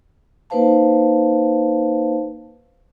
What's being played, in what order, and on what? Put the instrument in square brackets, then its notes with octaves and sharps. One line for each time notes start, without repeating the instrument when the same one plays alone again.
[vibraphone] A#3 D#4 B4 C5 F5 A5